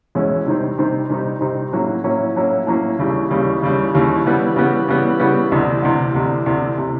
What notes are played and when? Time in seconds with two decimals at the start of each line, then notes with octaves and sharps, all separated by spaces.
0.15 E2 B2 G#3 C#4 E4
0.46 C3 D#3 G3 C4 D#4
0.78 C3 D#3 G3 C4 D#4
1.10 C3 D#3 G3 C4 D#4
1.41 C3 D#3 G3 C4 D#4
1.73 A2 F#3 A#3 C#4 E4
2.04 A2 F#3 A#3 C#4 E4
2.36 A2 F#3 A#3 C#4 E4
2.67 A2 F#3 A#3 C#4 E4
2.99 D#2 C#3 E3 G3
3.31 D#2 C#3 E3 G3
3.62 D#2 C#3 E3 G3
3.93 D#2 C#3 E3 G3
4.25 C#3 E3 G3 B3
4.56 C#3 E3 G3 B3
4.88 C#3 E3 G3 B3
5.20 C#3 E3 G3 B3
5.52 D2 C3 E3
5.82 D2 C3 E3
6.14 D2 C3 E3
6.46 D2 C3 E3
6.78 C3 E3